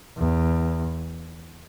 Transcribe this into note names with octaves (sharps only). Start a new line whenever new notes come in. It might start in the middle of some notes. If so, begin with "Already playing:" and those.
E2